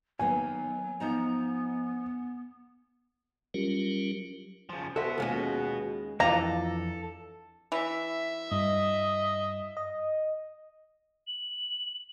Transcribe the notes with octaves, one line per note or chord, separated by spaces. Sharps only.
D#3 F#3 A#3 B3 G#5
F3 B3 D#4 A#5
F#3 G3 C#4 F4 G4 A#4
C#3 F3
F#4 A4 B4 C5 E5
D#2 G#3 C#4 F4
F2 E3 D4 F4 A4 A#5
E3 E5
G2 D#5
D#5
F#7